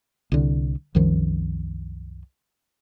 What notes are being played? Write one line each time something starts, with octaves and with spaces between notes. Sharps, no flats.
C2 D3
C2 F#2 D#3 F3